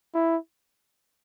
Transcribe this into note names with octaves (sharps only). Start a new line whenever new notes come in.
E4